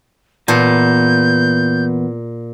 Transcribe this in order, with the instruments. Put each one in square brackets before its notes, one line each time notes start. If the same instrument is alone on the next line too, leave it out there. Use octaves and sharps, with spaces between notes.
[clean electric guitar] E2 B3 A5 [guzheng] A#2 [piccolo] G6